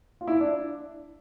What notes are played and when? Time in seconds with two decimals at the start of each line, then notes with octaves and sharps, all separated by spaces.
0.21 F4
0.27 E4
0.41 D4